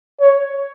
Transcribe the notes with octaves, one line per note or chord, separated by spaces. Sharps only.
C#5